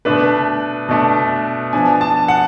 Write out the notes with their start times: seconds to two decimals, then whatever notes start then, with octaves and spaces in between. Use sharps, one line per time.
0.05 B2 A3 D4 B4
0.89 B2 A3 D4
1.73 F3 B3 D4 G#5
2.01 A5
2.28 F#5